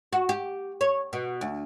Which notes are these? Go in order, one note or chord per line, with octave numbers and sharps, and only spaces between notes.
F#4
G4
C#5
B2
D2